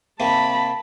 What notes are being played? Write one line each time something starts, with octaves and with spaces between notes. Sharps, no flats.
C3 D#3 A#3 A5 B5